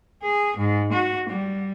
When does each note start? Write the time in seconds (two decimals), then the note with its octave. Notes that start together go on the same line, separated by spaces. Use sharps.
0.23 G#4
0.57 G#2
0.93 F#4
1.29 G3